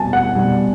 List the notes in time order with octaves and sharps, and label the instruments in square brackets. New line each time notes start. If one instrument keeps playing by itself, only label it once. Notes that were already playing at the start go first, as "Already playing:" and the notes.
Already playing: [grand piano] B2 G3 G#5 A5
F#5
B2 G3